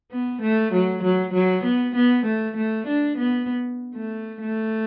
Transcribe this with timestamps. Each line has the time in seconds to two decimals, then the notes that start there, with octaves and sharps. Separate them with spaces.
0.11 B3
0.42 A3
0.73 F#3
1.03 F#3
1.33 F#3
1.64 B3
1.96 B3
2.26 A3
2.57 A3
2.87 D4
3.18 B3
3.95 A3
4.41 A3